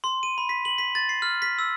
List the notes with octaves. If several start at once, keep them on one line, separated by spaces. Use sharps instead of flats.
C6
D#7
B5
B6
F#7
B6
A6
C7
F6
B6
E6